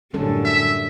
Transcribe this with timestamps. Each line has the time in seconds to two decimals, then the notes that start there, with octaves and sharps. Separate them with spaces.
0.14 F#2 A2 D3 G3 C#4 A4
0.45 E5